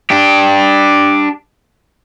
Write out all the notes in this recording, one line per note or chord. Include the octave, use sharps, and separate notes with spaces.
D4 G4